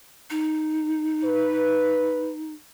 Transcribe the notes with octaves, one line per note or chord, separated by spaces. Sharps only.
D#4
B4